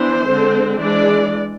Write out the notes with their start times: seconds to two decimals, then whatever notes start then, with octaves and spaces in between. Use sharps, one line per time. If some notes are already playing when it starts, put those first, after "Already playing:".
Already playing: E3 B3 D4 C5
0.28 D3 G#3 C4
0.80 E3 G#3 D4 D5